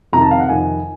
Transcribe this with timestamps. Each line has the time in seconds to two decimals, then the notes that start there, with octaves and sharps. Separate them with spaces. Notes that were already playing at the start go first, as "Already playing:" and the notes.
0.13 F2 C3 D#3 A#5
0.22 A5
0.31 F5
0.40 F#5
0.48 F2 C3 D#3 G#5